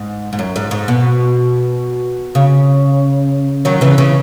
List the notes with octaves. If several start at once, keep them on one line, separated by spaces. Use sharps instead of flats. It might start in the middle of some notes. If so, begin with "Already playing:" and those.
Already playing: G#2
G#2
F#2
G#2
G#2
B2
C#3
D#3 F#3
C#3 E3
C#3 E3